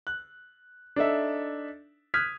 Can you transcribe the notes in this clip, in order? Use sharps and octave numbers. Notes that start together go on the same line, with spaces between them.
F#6
D4 D#4 A4 E5
D#6 F6 F#6 G#6 B6